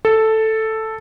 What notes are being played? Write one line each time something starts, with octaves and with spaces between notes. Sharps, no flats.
A4